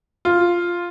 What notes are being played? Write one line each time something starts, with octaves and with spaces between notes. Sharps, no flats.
F4